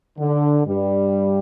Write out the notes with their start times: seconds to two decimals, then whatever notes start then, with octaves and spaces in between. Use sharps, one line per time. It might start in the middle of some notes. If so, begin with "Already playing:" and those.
0.19 D3
0.66 G2 G3